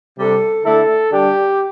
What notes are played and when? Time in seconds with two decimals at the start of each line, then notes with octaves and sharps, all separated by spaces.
0.17 C3 G3 D4 A4
0.64 D3 A3 E4 A4
1.11 D3 G3 D4 G4